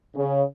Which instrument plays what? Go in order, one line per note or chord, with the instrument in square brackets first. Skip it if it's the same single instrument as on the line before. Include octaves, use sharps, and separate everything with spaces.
[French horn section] C#3